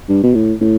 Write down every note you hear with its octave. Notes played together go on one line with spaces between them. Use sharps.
G2
B2
A2
A2